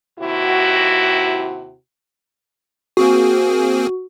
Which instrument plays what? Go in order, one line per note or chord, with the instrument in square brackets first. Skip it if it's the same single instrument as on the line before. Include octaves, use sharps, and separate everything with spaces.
[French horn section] D#2 C3 E4 F#4
[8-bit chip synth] A#3 C4 G#4 [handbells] F#4